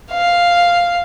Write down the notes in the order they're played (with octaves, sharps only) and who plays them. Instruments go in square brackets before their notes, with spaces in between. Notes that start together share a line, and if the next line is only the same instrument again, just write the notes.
[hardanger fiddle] F5